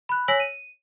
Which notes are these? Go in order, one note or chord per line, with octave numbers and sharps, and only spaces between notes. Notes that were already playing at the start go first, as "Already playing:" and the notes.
B5 F#6
C#5 G#5 E6 A#6 B6 F#7
D#7